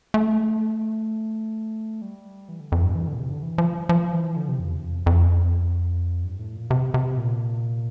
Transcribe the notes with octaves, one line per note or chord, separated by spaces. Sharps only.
A3
G3
E3
D3
F2
G2
E3
D3
A#2
C3
D3
E3
F3
F3
E3
D3
C3
F2
E2
F2
F2
G2
A2
A#2
C3
C3
A#2